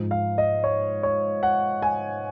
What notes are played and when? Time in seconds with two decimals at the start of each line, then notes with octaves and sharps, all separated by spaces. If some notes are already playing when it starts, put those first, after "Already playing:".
Already playing: G#2 F3
0.11 F5
0.38 D#5
0.64 C#5
1.03 C#5
1.43 F#5
1.82 G#5